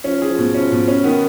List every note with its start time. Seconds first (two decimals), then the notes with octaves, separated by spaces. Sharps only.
0.04 F3 C#4
0.22 G#4
0.30 F3
0.38 B2
0.55 C#4
0.72 B2
0.88 C#4
1.04 D#3 B3